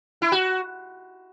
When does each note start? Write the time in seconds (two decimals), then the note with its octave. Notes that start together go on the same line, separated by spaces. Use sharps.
0.22 E4
0.32 F#4